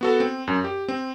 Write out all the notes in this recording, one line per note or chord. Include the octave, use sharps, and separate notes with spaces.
B3 F#4 A4
C4
F#2
G4
C4